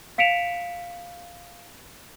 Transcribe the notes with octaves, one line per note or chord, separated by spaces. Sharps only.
F5 B6 C#7 D7 E7 F7